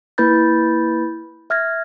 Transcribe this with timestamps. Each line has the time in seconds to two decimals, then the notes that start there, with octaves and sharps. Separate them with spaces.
0.18 A#3 E4 B4 B5 G6 A6
1.50 E5 F6 G#6 A#6